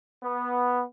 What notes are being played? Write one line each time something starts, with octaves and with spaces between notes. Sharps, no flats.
B3